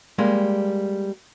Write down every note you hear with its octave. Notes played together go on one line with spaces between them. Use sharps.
G3 G#3 A#3